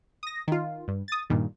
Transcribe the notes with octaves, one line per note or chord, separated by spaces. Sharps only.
D#6 A#6
D#3 F4
G2
D#6 A6
G2 A#2 D#3